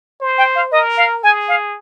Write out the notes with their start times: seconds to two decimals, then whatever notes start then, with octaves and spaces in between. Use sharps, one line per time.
0.21 C5
0.38 G5
0.55 F5
0.72 A#4 D#5
0.97 F5
1.23 G#4 G#5
1.48 F5